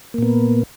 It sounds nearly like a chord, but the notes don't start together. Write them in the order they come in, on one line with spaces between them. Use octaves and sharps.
A#3 A#2 B3